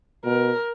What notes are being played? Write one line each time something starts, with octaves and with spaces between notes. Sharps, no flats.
B2 A#4